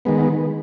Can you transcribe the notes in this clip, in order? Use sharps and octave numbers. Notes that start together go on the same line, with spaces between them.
D#3 G#3 B3